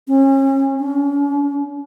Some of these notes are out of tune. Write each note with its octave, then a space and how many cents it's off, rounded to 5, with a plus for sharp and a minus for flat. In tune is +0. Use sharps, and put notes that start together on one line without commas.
C#4 -35
C#4 +40